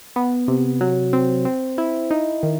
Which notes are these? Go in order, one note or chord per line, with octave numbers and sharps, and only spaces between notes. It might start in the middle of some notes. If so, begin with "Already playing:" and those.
B3
C3
F#3
C4
C4
E4
D#4
D#3